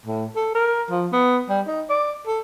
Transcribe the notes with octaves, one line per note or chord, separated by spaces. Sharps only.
A2
A4
A#4
F3
B3
G3
D#4
D5
A4